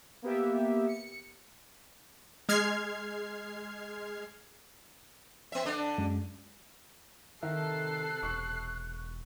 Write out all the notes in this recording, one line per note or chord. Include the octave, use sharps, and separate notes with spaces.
A#3 B3 G4 E5
C#7
G#3 F6 G#6 C7
B3 E5
D3 D4
F#2 G#3
C3 D#3 A4 A#4 E5 F#6 C7
E1 C#6